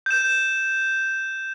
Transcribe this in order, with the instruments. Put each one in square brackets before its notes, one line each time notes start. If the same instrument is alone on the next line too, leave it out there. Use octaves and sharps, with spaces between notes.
[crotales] G6 E7